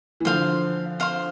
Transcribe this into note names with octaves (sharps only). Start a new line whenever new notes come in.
E3
D3 F3 C5 F5 C6
C5 F5 C6